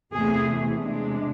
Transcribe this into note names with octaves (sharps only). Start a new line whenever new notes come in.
E2 C3 E3 A3 G#4
C3 G#3 D4